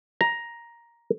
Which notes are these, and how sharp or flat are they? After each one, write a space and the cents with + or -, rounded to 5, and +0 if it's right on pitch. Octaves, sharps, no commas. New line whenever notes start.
A#5 +10